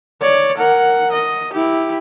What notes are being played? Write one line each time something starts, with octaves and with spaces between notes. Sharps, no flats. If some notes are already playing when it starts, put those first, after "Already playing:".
C#5 D5
A#4 F#5
D#5
E4 G4